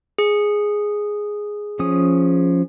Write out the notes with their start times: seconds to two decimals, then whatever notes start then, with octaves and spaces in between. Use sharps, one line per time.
0.18 G#4
1.79 F3 C#4 D#6